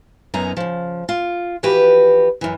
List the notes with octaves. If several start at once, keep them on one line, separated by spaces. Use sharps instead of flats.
F#2 B3 C#4 D#4 A#5
C#3 F3
F4
E3 F3 F#4 G4 B4
F#2 E3